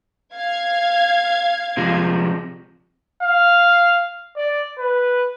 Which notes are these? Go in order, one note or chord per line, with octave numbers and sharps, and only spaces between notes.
F5 G#6
C3 F3 G#3
F5
D5
B4